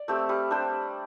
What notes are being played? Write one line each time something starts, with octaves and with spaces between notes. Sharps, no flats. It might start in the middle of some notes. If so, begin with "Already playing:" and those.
Already playing: D5
A3 C4 G4
G3
D4 G4 C5